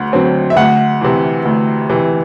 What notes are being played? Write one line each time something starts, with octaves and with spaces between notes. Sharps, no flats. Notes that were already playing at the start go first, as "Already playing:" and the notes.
Already playing: D2 D3 F#5
D3 F#3 C4
E5
D2 F#5
C3 E3
D2
C3 E3